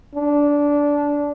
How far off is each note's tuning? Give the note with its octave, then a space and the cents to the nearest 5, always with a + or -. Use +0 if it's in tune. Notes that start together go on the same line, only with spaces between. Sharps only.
D4 -15